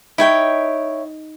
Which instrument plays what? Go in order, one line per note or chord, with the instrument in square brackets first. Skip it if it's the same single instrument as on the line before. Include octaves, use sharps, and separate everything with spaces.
[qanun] D#4 [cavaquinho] E4 C#5 G5